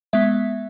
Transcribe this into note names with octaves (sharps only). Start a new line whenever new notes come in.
G#3 B3 E5